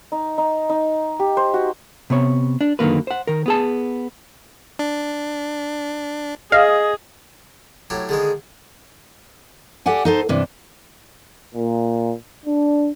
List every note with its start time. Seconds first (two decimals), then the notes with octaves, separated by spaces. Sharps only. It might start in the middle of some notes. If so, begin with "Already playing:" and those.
0.12 D#4
0.38 D#4
0.70 D#4
1.20 G4
1.37 C5
1.54 F#4
2.10 C3 B3 C#5
2.61 D4
2.79 F#2 D3 D#3 A#3 B4
3.07 C5 F#5
3.27 D#3 A#4
3.46 B3 G#4 A5
4.79 D4
6.52 G#4 D#5 F5
7.90 A2 F#3 G4
8.09 D3 D#3 G#3 G#4
9.86 G4 A4 D5 F#5 G#5
10.05 D#4 A4 C5
10.29 G2 C3 E3 D4
11.54 A#2
12.45 D4